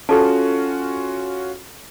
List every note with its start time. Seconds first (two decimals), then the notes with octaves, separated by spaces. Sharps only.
0.09 C#4 F4 F#4 A4 A5